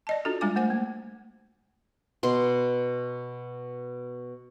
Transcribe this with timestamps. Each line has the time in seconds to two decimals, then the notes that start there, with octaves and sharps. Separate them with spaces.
0.07 D5 D#5 A5
0.25 D4 F4 F#4 A4
0.41 G3 G#3 D4 F4 G#5 D6
0.56 A3 C5 G#5
0.70 A#3
2.23 B2 C6